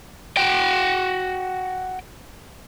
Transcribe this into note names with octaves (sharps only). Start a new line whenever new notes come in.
F#4 G5